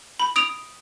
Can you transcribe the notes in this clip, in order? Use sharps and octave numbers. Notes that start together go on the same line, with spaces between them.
B5
D#6 D7 F7